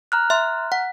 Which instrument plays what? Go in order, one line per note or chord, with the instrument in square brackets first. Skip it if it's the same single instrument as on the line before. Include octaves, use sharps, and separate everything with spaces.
[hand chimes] A#5 F6 F#6
[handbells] E5 C6
F#5